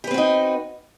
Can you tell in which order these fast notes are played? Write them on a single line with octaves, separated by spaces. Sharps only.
G4 B4 C4 F#4 D#4